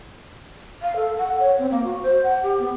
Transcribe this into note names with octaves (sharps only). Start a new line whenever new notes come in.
F5
A4
F#5
C#5
C4
A#3
F#4
C5
F#5
G4
B3